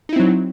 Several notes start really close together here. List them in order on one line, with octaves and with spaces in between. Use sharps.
D#4 E4 C4 F#3